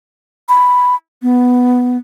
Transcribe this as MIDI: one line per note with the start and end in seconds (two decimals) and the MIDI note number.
0.49 0.95 83
1.22 1.97 59